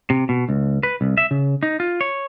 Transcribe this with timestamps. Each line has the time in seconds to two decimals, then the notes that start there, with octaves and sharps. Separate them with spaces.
0.10 C3
0.29 B2
0.49 C#2
0.83 B4
1.01 C2
1.17 E5
1.31 C#3
1.63 D#4
1.80 F4
2.01 C#5